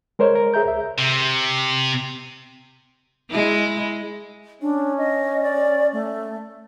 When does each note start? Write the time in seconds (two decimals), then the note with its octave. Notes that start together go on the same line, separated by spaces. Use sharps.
0.19 G#3 A#4 C5 C#5 D#5
0.35 A#4
0.54 G#4 E5 A#5 G6
0.66 C#2 E5
0.98 C3
3.30 G#3 E4
4.62 C#4 D4
4.98 D#5
5.43 D5
5.93 A3